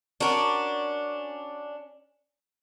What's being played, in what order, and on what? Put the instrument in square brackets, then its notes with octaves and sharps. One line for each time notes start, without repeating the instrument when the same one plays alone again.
[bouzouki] C#4 D4 [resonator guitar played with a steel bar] F#4 A#4